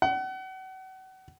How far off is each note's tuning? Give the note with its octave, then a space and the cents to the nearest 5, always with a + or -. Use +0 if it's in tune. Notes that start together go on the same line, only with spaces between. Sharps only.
F#5 +35